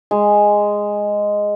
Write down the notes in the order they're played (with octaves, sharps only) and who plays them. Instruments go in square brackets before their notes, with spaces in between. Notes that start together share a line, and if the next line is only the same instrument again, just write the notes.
[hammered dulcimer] G#3